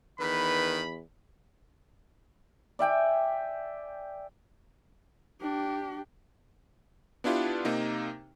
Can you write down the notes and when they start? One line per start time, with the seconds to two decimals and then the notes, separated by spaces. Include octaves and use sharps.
0.20 E2 D#3 B4 B5
2.79 D5 E5 G5 G#5
5.41 D4 G4
7.24 B3 D4 E4 F4 G4
7.65 C3 A#3 D#4